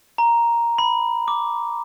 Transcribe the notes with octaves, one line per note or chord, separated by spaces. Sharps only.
A#5
B5
D6